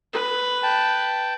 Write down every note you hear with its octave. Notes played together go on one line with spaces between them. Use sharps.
B4
G5 A5